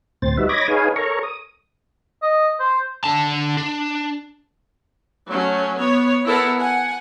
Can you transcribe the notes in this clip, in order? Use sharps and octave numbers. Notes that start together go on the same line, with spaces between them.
D2 A2 C4 C5 A6
G3 D#4 F#4 B4 E5
C#5 D#5 B5 D6 G#6 A#6
D#4 G#4 B4 C#5 F5 G#5
A4 A#4 C#5 A#5 C#6
D#6
D#5
C5
D3 A5
D4
F#3 A3 C#4
B3 C#5
B3 E4 A4 A#4 F#5
F#5 G#5